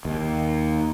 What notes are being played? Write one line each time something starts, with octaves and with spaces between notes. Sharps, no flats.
D#2